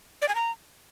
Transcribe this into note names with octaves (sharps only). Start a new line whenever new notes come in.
D5
G#5
A#5